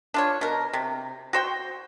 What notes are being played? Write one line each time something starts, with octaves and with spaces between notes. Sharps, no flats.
D4 F4 C#5
B2 A#4
C3
F#4 C5 G5